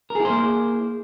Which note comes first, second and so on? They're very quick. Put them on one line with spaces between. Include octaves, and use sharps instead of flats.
A#4 G#4 E4 C5 A#3